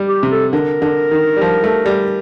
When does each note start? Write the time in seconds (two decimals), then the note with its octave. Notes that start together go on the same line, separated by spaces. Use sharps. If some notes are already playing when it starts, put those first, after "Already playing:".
Already playing: G3
0.08 G4
0.23 C3
0.31 A4
0.53 D3 A#4
0.82 D3
1.11 D#3
1.37 G3
1.41 F3
1.64 A3
1.86 G3